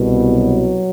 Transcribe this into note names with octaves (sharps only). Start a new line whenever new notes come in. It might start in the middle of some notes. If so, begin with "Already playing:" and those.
Already playing: C2 B2
F#3